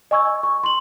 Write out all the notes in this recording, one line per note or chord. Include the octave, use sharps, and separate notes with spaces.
D#5 G#5 C#6 E6 G#6
C#6
C6 F#7